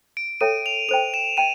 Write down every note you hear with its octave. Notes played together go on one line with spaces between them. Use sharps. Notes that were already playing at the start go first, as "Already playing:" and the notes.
D7
A4 C#5 E5 G5 D#7
F7
A4 C5 D#5 G5 F7
E7
D#5 G5 D#7